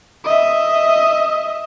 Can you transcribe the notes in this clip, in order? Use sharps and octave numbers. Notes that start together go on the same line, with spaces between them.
D#5 E5